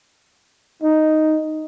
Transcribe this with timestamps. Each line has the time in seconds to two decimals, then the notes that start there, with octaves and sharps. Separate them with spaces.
0.83 D#4